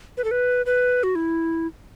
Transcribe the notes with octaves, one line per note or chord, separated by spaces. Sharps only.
B4
A4
B4
B4
F#4
E4